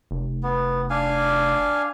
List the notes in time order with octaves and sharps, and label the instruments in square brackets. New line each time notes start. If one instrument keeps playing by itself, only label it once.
[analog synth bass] F1
[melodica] B3
D4 F5 G#5